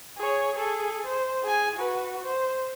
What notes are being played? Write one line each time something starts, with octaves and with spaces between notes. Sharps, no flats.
G#4 C#5
G#4 A4
C5
G#4 G#5
F#4 B4
C5